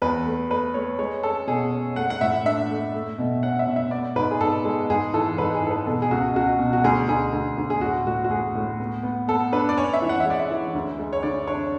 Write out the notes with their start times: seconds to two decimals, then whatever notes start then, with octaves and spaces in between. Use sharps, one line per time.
0.02 E2 B4
0.26 A3
0.50 A3 B4
0.74 A3 C#5
0.99 G#3 C#5
1.23 C#4 A4
1.47 B2 G#4
1.72 C#4
1.96 A3 F#5
2.10 F#5
2.21 A2 E5
2.45 D4 E5
2.70 A3
2.94 A3
3.18 B2
3.43 C#4 F#5
3.59 E5
3.67 B2
3.76 E5
3.91 B3 D5
4.16 G#2 B4
4.31 G#4
4.40 G#2 A4
4.65 G#3
4.90 G#2 G#4
5.14 E3 A4
5.38 G#2 B4
5.54 G#4
5.63 E3 A4
5.71 B4
5.86 B2 A4
6.02 G#4
6.11 C#2 F#4
6.36 C#2 F#4
6.59 B2
6.73 F#4
6.84 D2 G#4
7.09 D2 G#4
7.33 D2
7.58 D2
7.70 G#4
7.81 A2 F#4
8.07 A2 F#4
8.24 F#4
8.31 A2 G#4
8.55 A2
8.80 B3
9.03 B3
9.28 B3 A4
9.52 D4 B4
9.69 D5
9.77 C#4 C#5
9.93 E5
10.02 E3
10.09 F#5
10.20 E5
10.26 G#3 D5
10.39 E5
10.50 E3
10.74 D2
10.99 G#3
11.13 C#5
11.23 D3 D5
11.47 D4 C#5